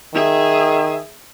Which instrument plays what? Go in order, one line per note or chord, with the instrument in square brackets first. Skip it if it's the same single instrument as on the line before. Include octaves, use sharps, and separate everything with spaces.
[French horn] D#3 [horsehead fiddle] G#4 E5